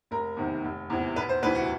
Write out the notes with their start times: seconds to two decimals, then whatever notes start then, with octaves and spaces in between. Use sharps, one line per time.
0.11 F1 A#4
0.37 E2 C3 D#3
0.64 F1
0.90 E2 C3 E3
1.16 E1 B4
1.29 C5
1.43 D2 C3 E3 B4
1.55 F#4